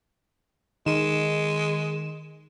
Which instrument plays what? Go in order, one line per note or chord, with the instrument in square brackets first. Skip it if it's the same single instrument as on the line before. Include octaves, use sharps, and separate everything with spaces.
[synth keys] D#3 E7 [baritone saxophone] G#3